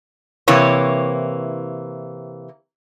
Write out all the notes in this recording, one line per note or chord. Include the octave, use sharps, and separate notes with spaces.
C3 E3 A#3 C#5